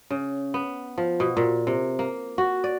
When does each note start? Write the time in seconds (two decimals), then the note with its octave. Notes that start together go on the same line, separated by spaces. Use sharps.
0.10 C#3
0.54 B3
0.98 F3
1.20 B2
1.37 A#2
1.67 C3
1.99 A#3
2.38 F#4
2.64 D5